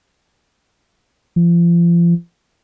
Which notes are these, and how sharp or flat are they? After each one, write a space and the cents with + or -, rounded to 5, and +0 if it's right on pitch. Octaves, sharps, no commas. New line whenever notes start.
F3 -35